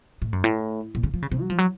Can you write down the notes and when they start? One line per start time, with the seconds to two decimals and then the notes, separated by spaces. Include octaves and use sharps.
0.22 A2
0.33 F#2
0.44 A2
0.95 A#2
1.03 C#3
1.14 F3
1.22 C#3
1.32 C3
1.41 F#3
1.50 F3
1.58 F#3